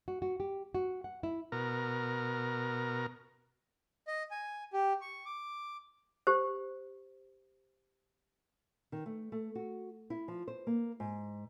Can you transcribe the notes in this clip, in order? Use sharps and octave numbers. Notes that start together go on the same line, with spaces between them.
F#4
F#4
G4
F#4
F#5
E4
B2 A#4
D#5
G#5
G4
C#6
D6
G4 C5
D#3
A3
A3
F#4
E4
F3
C5
A#3
G#2